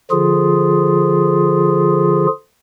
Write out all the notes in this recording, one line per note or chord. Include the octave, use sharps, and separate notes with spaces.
D3 F3 F4 G#4